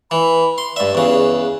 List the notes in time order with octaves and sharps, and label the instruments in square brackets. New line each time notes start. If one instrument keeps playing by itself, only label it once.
[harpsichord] E3 [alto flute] B5
[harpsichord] C6
[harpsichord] G2 E5 [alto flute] D5
[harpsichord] E2 C#3 [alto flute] B4